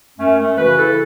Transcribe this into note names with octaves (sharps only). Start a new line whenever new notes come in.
F#2 A3 C#4
A3
C#3 E3 F#4 B4
E4 A4